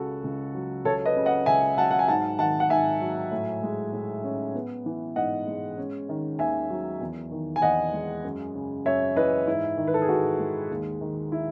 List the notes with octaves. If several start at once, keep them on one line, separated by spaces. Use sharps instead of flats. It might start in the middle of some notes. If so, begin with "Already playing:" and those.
Already playing: C#2 C#3 F#4 A4
C#2
F#3
C#2 A4 C#5
B4 D#5
C#3
D#5 F#5
C#2 E5 G#5
F#3 F#5 A5
F#5
G#5
G#2 F#5 A5
D#3 F#5 A5
F#5
G#2 E5 G#5
F#3
A2
G#3
A2
C#4
B3
E3
G#2 D#5 F#5
G#3
C#4
D#3
D#2 E5 G#5
F#3
E2
D#3
G#5
E2 D#5 F#5
G#3
F#2
C#3
F#2 C#5 E5
E3 B4 D#5
G#2 E4
D#3
B4
A4
G#4
G#2 F#4
G#3
D#2
D#3
E4